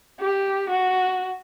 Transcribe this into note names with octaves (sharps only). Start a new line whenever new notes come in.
G4
F#4